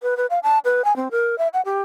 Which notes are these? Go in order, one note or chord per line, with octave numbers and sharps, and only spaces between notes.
B4
B4
F5
A5
B4
G#5
C4
A#4
E5
F#5
G4